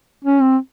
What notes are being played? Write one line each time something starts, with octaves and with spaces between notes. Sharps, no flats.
C#4
C4